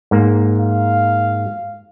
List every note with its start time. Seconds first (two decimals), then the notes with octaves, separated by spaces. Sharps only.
0.11 G#2 A#3
0.58 F5